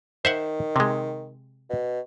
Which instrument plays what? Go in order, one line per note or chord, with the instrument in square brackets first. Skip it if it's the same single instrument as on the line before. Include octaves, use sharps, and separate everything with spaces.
[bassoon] D#3 [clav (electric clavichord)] C5 E5 F#5
[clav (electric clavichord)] C3 G#3
[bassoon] B2